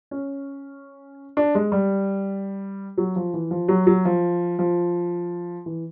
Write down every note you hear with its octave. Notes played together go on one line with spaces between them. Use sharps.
C#4
D4
G#3
G3
F#3
F3
E3
F3
F#3
F#3
F3
F3
E3